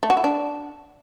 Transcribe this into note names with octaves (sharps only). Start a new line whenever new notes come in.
A3
F#4
E4
D4